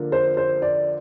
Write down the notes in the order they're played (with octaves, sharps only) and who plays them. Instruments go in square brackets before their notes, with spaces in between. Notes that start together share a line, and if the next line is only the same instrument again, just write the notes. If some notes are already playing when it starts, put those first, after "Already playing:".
Already playing: [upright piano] D3 F3 A#3
C5
C5
D5